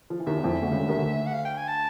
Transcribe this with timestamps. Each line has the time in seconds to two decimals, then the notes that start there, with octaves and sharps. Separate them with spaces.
0.10 F3
0.19 E3
0.26 D#2 D#3 E5
0.35 E2 E3
0.44 F2 F3
0.53 E2 E3
0.62 D2 D3
0.71 C#2 C#3
0.80 D2 D3
0.88 D#2 D#3
0.97 D2 D3
1.26 F#5
1.34 F5
1.45 G5
1.57 G#5
1.68 A5